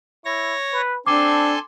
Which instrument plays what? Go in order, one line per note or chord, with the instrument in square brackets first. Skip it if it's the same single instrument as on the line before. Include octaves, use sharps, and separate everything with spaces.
[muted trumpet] E4 [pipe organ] C#5 A#6
[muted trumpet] B4
[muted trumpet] C4 [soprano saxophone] D4 [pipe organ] A4 G#5 C6 [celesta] D6